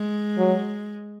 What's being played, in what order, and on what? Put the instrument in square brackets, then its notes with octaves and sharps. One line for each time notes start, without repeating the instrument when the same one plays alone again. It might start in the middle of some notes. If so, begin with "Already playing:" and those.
Already playing: [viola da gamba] G#3
[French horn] F#3